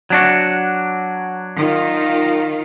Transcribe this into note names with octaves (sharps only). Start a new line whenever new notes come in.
F#3 D4 F#4
D#3 F4